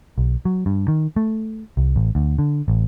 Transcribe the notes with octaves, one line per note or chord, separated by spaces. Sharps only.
B1
F#3
G2
D#3
A3
C2
A1
D2
D3
A1